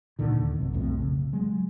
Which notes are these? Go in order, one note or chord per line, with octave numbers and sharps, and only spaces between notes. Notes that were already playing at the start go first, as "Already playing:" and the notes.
C#2 A#2 D3 D#3
D#2
B1 G2 C3
B1 F2 A2 C4
C#3
F#3 G#3